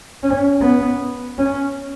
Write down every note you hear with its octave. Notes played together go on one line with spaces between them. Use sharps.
C#4
B3
C#4